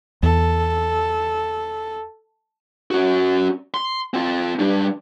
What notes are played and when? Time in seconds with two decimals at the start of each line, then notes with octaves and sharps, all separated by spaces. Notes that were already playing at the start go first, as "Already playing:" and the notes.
0.23 E2 A4
2.91 C#4 F#4
3.74 C6
4.14 C4 F4
4.59 G3 D4